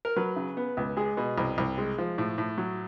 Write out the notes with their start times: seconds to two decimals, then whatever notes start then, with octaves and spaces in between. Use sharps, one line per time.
0.05 A#4
0.16 F#3 B4
0.36 C#3
0.57 B3
0.77 C#2
0.97 G#3 G#4
1.17 B2
1.38 C2
1.58 C2
1.78 G#3
1.98 F3
2.18 A2
2.38 A2
2.58 F#3